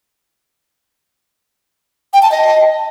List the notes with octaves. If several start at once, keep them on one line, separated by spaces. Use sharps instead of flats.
G5
A5
D#5